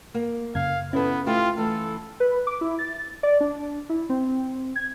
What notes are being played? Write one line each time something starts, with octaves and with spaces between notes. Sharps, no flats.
A#3
F#2 C#3 F5 G#6
B3 C#4 E4 A4 B4
A3 E4 F4 G4
E3 A3 A4
B4
D6
E4
A6
D5
D4
E4
C4
G#6